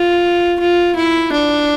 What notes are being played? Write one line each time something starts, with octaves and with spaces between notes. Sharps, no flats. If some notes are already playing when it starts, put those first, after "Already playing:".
Already playing: F4
F4
E4
D4